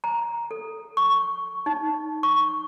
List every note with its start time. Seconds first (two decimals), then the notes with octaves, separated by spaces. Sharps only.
0.04 A#5
0.51 A4
0.97 C#6
1.66 D#4
2.23 C#6